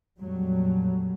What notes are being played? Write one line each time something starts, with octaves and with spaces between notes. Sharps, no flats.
F2 A#2 F#3 G3 A3